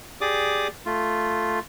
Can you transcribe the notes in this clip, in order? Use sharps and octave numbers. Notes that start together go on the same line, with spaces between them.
G4 G#4 D5 D6 D#6
A3 F4